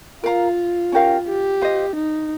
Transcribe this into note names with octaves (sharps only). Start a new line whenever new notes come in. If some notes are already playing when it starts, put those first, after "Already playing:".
F4 A#4 F5 A#5
C#4 G4 A#4 F5
G4
F4 C5 D#5
D#4